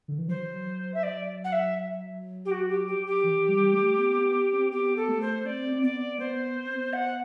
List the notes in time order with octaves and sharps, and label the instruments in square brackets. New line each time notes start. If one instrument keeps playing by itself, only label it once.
[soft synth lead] D3
E3
[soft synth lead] F#3 [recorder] C5
[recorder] E5
D5
F#5
E5
G4
F#4
G4
G4
G4
[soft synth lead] E3
G3
A3
B3
B3
C4
[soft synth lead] B3 [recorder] G4
[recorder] A4
[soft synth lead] A3
[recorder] C5
[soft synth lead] C4 [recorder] D5
[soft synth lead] C4
[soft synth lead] B3 [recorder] D5
[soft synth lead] B3 [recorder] C5
[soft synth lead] B3
C4
B3
[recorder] F#5